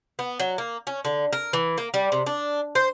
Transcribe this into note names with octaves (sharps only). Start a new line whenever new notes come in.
B3
F#3
A#3
C#4
D3
A#4
E3
A#3
G3
C3
D4
C5